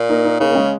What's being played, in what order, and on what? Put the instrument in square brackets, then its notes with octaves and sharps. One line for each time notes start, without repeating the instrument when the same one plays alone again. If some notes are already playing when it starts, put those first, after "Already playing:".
Already playing: [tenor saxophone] A#2
[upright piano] A#3 D#4
A#3 D#4
[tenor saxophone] C#3 [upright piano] A#3 D#4
[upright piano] A#3
G#3 C#4